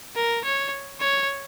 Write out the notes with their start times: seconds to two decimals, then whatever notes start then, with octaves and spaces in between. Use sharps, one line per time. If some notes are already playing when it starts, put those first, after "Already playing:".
0.16 A#4
0.44 C#5
1.01 C#5